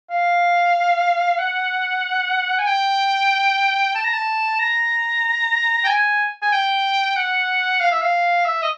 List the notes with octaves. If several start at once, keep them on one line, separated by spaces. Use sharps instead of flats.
F5
F#5
G#5
G5
A5
A#5
A5
A#5
G5
G#5
G#5
G5
F#5
F5
E5
F5
E5
D#5